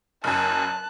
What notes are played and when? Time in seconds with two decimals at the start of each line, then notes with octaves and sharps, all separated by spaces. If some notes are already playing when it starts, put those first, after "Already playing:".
0.24 F#1 F#2 A5 F#6